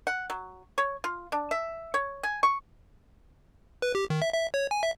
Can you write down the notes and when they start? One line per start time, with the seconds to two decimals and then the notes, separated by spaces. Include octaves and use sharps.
0.07 F#5
0.30 F#3
0.78 C#5
1.04 F4
1.32 D4
1.51 E5
1.94 C#5
2.23 G#5
2.43 C#6
3.82 B4
3.95 G4
4.10 D#3
4.22 E5
4.34 E5
4.54 C#5
4.71 G#5
4.83 E5